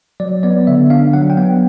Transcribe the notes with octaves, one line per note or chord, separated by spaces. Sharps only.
F#3 D5
B3 D5
D3 E5
D4 F5
F#3 F#5
G5
B3 F#5